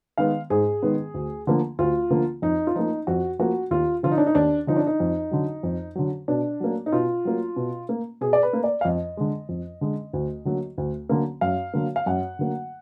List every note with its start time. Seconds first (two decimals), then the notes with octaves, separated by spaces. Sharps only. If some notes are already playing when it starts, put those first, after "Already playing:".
0.18 D#3 G#3 B3 F5
0.50 G#2 G#4
0.83 D#3 G#3 B3
1.14 D2
1.47 D3 F3 A#3
1.79 D2 F4
2.10 D3 F3 A#3
2.42 F2 D#4
2.67 F4
2.75 F3 A#3 D#4
3.07 F2 F#4
3.39 F3 A#3 F#4
3.71 D#2 F4
4.03 D3 F3 F4
4.12 D#4
4.18 D4
4.27 D#4
4.35 D#2 D4
4.67 D3 F3 D#4
4.76 D4
4.87 D#4
5.00 F2
5.31 D3 F#3
5.63 F2
5.96 D3 F#3
6.28 B2 D4
6.60 F#3 A#3
6.86 D#4
6.92 B2 F4
7.25 F#3 A#3
7.56 B2
7.89 A#3
8.21 B2 G#4
8.33 D5
8.43 B4
8.53 A#3
8.64 D5
8.81 F5
8.85 F2 D#5
9.17 D3 G#3
9.49 F2
9.81 D3 G#3
10.13 D2
10.45 D3 F#3 A#3
10.78 D2
11.09 D3 F#3 A#3
11.41 F#2 F5
11.73 D3 F#3 A#3
11.96 F5
12.06 F#2 F#5
12.39 D3 F#3 A#3